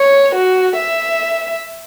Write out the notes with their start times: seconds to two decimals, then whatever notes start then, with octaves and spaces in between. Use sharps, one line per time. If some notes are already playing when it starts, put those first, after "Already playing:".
Already playing: C#5
0.35 F#4
0.77 E5